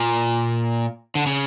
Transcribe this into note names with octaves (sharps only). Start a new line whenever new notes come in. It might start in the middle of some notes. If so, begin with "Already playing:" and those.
Already playing: A#2
D3
C#3